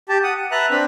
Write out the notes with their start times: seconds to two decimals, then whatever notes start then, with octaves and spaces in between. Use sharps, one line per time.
0.09 G4 A5
0.23 F#5 D#6
0.36 F#5
0.51 B4 E5 A5 A#5 F#6
0.70 C4 D4 B4 B5